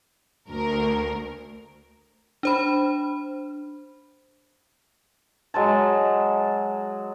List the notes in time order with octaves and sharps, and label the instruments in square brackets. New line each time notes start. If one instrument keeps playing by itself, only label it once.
[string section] D2 A#4
[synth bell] D4 C5 B5
[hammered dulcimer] F#3 G#3 A5